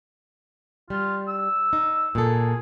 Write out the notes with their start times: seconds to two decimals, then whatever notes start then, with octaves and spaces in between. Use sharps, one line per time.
0.90 G3 F4
1.28 E6
1.73 D#4
2.15 A#2 G#4 A4